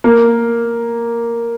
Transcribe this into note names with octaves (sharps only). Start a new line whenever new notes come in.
A#3